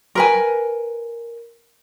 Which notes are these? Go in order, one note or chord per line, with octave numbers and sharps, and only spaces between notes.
A#4 B4 G#5